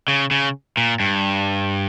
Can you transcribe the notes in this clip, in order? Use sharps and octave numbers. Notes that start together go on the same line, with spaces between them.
C#3
C#3
A#2
G2